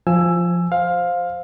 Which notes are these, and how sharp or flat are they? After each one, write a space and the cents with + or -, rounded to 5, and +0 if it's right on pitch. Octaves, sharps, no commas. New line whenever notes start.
F3 +0 G#5 +0 E6 +15
C5 +0 F5 +15